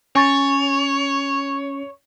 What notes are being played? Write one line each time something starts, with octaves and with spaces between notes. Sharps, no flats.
C#4 C#5 G#5 C#6 A6